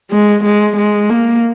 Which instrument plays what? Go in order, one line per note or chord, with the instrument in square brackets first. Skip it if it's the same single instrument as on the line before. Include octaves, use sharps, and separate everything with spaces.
[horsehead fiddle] G#3
G#3
G#3
A#3